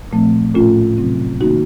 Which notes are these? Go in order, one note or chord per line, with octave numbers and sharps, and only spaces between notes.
A#2 F3 A3 C4
A2 A3 C#4 F4
C3 F#3 C4
D#3 A#3 C#4 D#4 F#4